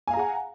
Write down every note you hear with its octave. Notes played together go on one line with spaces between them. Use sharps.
G#4 F5 F#5 G#5 A#5